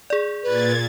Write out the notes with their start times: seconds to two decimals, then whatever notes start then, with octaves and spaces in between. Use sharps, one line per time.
0.10 G#4 D5
0.43 A#2 B4 G#6 A6